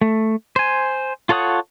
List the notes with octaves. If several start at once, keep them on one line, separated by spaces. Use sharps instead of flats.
A3
C5 G#5
F4 A4 C#5 F#5 D#6